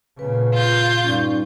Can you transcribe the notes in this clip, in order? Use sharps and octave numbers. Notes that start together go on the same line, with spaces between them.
A#2 C#3 B4
F4 G6
G2 C#4 D#4 D5